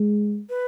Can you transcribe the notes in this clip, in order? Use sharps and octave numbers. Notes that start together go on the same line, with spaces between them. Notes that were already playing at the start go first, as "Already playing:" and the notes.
Already playing: G#3
B4